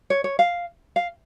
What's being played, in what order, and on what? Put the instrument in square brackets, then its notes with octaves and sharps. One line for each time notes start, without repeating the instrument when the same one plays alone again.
[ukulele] C#5
C#5
F5
F5